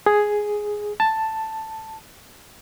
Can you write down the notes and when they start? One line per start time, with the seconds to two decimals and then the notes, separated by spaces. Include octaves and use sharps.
0.06 G#4
1.00 A5